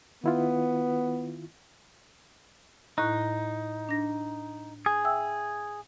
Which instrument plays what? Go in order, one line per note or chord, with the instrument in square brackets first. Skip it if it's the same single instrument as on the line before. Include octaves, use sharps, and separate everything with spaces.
[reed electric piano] D#3 E4 F4 [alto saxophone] B3
[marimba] A2 E4 F#6 [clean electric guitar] D#4
[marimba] D4 A#6
[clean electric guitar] G#4
[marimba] E5 G5 E6